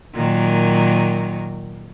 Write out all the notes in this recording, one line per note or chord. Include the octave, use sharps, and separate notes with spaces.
A#2 D#3 F#3